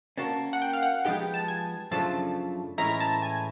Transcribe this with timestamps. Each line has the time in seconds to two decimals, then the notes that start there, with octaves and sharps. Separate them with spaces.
0.18 A#3 C#4 F#4 A5
0.53 F#5
0.62 G5
0.73 F5
0.83 F#5
1.05 F3 G#3 B3 D#4 G4 G5
1.34 A5
1.48 G#5
1.91 F#2 C#3 F3 A3 D4 A5
2.78 A2 E3 G#3 C#4 E4 A#5
3.00 A5
3.22 G#5